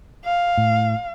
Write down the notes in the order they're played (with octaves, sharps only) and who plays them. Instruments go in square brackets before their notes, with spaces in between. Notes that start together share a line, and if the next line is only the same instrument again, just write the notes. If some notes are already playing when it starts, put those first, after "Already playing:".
[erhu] F5
[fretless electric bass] A2